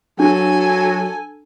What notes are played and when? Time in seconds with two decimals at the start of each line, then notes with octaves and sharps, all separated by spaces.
0.20 F#3 D4 A4 G#5